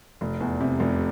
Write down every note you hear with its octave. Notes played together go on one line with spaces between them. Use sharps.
F1
E2
C3
F1